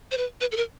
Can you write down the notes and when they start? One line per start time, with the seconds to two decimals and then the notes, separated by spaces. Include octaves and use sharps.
0.11 C5
0.17 B4
0.41 B4
0.52 A4
0.57 A#4